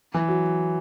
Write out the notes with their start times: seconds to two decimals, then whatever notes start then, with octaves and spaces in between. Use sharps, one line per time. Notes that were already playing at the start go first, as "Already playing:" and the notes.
0.14 E3
0.29 F#3